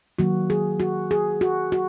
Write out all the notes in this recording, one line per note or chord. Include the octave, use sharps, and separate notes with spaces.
D#3 F#3 A#3 F#4
G#4
F#4
G#4
F#4
F#4